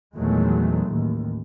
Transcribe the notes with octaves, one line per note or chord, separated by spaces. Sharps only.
E2 A#2 D#3 F#3 G#3 A3
A1 D#2